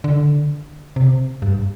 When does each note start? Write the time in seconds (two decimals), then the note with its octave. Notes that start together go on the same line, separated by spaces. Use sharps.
0.04 D3
0.96 C3
1.42 G2